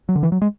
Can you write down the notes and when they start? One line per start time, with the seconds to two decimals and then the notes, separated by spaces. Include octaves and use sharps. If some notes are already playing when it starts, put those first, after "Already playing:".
0.09 F#3
0.16 D3
0.23 E3
0.32 F#3
0.42 G#3